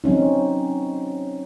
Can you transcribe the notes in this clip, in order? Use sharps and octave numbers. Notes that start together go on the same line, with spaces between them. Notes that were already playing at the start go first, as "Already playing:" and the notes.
F#3 C4 C#4 D#4